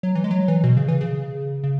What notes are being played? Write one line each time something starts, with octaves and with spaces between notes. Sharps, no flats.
F#3
E3
G#3
F#3
E3
B2
C#3
E3
C#3
C#3